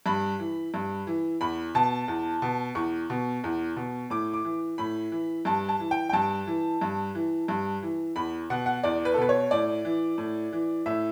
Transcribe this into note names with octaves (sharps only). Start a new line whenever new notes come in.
G2 B5
E3
G2
E3
E2 B5
B2 A5
E2
B2
E2 C#6
B2
E2
B2
A2 D6
D6
E3
A2 B5
E3
G2 A5
A5
E3
G5
G5
G2 A5
E3
G2
E3
G2
E3
E2 B5
B2 F#5
F#5
E2 D5
B4
A4
B2 B4
C#5
A2 D5
E3
A2
E3
A2 E5